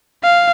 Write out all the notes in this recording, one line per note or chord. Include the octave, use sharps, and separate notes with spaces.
F5